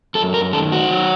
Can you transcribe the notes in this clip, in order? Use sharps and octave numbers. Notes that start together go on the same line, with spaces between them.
F#2 A4
A#4
D#3 A4
F#4
F#3